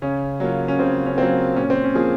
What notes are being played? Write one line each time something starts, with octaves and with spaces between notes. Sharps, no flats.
C#3 C#4
F#3 A#3 F4
C#4
C#3 C4
C#4
F#3 A#3 C4 F4
A#2 C#4
C4
C#4
F3 A#3 F4 G#4